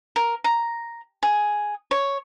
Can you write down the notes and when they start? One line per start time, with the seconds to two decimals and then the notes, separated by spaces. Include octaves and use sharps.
0.16 A#4
0.44 A#5
1.23 G#4
1.91 C#5